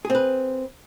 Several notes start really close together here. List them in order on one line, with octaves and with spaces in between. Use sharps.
G#4 C4 B4